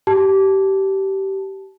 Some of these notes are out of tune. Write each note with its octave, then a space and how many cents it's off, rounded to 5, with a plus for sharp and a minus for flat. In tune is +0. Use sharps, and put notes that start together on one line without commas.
G4 -20 A5 -15